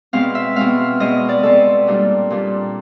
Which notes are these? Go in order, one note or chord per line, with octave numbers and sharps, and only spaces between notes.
B2 G#3 C4 F5
E5
B2 G#3 C4 F5
B2 G#3 C4 D#5
D5
B2 G#3 C4 A4
A#2 G3 A#3 D4
A#2 G3 A#3 D4